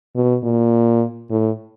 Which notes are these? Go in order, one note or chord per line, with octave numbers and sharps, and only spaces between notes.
B2
A#2
A2